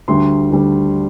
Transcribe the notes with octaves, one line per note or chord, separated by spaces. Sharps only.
D2 D3 G3 C6
D2 D3 G3